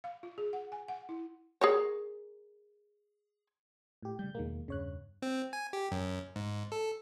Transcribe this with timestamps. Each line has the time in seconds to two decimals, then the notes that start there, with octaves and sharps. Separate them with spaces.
0.04 F5
0.23 F4
0.38 G#4
0.53 F#5
0.72 G#5
0.88 F#5
1.09 E4
1.61 G#4 A#4 C#5
4.02 A2 G4
4.19 C#3 G3 G6
4.35 E2 B2 D#3 G#3 A#3
4.68 E2 G2 C#3 C#5 F#6
5.22 C4
5.53 G#5
5.73 G4
5.91 F#2
6.36 G#2
6.72 A4